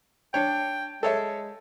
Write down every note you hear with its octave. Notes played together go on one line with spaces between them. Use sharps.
D4 C#5 G5
G#3 A4 C#5 E5